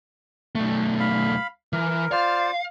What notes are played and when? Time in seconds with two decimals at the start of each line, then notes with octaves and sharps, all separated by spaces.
0.55 B1 A3
1.00 F5 B5
1.73 E3 A#4
2.12 F4 C5 D5 F5